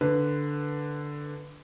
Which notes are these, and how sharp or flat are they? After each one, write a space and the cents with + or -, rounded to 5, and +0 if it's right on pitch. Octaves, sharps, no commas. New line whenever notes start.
D3 +0 B4 +0